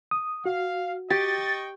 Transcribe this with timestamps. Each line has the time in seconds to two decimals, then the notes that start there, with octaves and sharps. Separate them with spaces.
0.11 D#6
0.46 F#4 F5
1.10 G4 D#5 G5 C#6 A6